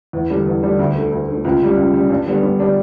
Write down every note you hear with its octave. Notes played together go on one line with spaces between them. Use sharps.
E2
D3 G3 D4
E2
D3 G3 D4
D2
D3 A3
D2
D3 A3
C#2
C#3 G3
C#2
C#3 G3
G2
D3 G3 B3 D4
G2
D3 G3 B3 D4